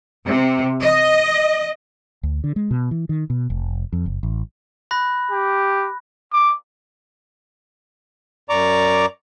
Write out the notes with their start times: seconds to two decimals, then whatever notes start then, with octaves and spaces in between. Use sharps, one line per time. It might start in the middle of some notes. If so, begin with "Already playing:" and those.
0.25 C3
0.82 D#5
2.23 D2
2.44 D3
2.56 G#3
2.71 B2
2.91 E3
3.09 D#3
3.30 B2
3.50 F1
3.93 F2
4.06 F#1
4.23 A1
4.91 B5 F#6 A#6
5.32 G4
6.33 D6
8.49 F#2 D5 A#5 C#6 D6